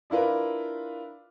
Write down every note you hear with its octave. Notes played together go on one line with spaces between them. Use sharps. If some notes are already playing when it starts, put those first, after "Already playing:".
D4 E4 F4 A#4 B4